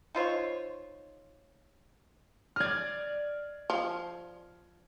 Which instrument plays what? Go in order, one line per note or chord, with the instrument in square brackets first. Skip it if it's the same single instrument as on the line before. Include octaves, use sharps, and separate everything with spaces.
[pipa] D#4 F4 C5 C#5
[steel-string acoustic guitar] D5 D#5 [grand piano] F6 G#6
[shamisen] F3